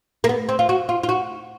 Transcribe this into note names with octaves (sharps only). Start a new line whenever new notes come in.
A#3
B3
C4
F4
F#4
F4
F4
F#4